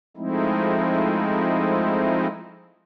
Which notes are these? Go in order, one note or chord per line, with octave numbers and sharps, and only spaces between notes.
F3 G#3 A3 C4 D#4 E4